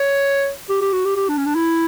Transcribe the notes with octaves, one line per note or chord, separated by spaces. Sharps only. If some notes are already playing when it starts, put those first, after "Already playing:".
Already playing: C#5
G4
G4
F#4
G4
G4
D4
C#4
D4
E4